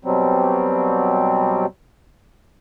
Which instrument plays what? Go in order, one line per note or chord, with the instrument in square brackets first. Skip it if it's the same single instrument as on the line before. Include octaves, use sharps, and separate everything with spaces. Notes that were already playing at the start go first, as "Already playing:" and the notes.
[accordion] B2 F#3 G3 C4